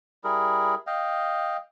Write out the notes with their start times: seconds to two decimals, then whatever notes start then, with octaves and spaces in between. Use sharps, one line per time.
0.24 G3 E4 G#4 A#4
0.87 D#5 F5 G5